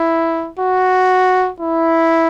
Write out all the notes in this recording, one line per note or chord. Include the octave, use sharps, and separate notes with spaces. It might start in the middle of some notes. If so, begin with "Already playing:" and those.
Already playing: E4
F#4
E4